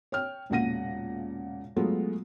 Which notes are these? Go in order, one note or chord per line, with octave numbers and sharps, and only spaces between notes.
C#5 G5 F6
E1 A#2 C#3 F#5 A#6 D#7
F#3 G#3 A3 B3 F4